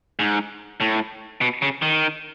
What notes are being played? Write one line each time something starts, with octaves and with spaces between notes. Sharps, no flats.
G#2
A2
B2
C#3
D#3